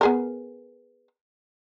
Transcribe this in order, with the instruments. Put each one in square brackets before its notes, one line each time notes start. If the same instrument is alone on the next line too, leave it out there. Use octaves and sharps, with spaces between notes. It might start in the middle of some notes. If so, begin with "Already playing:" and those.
[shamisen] B3 G#4 A#4